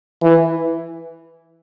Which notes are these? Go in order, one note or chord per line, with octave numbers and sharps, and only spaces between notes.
E3